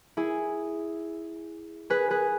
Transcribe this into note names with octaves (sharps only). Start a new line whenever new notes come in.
E4 G#4
G#4 B4
G#4 B4